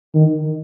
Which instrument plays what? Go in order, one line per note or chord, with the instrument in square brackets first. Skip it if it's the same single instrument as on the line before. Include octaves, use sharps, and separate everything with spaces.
[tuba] D#3